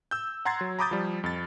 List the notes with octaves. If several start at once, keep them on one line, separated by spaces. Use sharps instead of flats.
E6 G6
F#5 A#5 C6 G#6 A6 C7
F#3
A#5 B5 D6 D#6 G6 A6
F3 G3
F2 A6